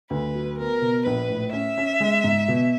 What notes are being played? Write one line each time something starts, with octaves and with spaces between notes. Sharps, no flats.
D2 B4
F#3
B3 A#4
B2
A#1 B4
A2
C#4 E5
C#4
G#3
G#2
B2